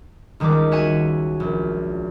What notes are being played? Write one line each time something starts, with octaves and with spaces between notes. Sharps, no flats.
C#2 D#3 G3 G#3 D6
F#4 C#5 E5 F#5 G#5
A#1